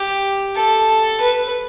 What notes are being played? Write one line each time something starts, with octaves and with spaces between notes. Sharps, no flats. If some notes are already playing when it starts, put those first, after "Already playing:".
Already playing: G4
A4
B4